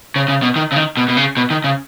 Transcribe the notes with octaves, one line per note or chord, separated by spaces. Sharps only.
C#3
C#3
B2
D#3
C#3
D#3
B2
B2
C#3
B2
D#3
C#3